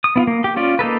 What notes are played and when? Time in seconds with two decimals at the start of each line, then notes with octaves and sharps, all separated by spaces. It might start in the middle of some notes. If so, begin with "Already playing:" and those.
0.04 D#6
0.16 B3 E4 F4
0.27 A#3
0.44 G4
0.56 C#4 F4 D5
0.79 A#3 D#4 A4 B4